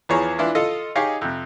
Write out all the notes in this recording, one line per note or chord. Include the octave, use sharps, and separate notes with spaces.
E2 E3 F3 G#4 C#5 A#5
E3 D4 E4 F4
F4 A4 D#5
D#4 G4 G#4 C#5 D#5 F5
F2 C3